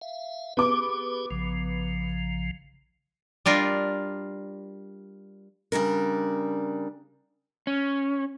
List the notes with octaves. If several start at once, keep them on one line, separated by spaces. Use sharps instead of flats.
E5 F5
B3 G4 G#4 D6
A#1 C#3 F3
G3 D4 F4 A#4
C#3 G3 D4 A#4
C#4